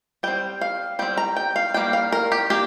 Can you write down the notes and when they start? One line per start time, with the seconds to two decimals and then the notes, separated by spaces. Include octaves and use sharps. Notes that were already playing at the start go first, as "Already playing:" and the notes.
0.23 G3 C4 G5
0.61 F5
0.99 G3 C4 G5
1.17 A#5
1.36 G5
1.56 F5
1.74 G3 A#3 D4 G5
1.93 F5
2.12 A#4
2.32 G4
2.50 A#3 D4 G4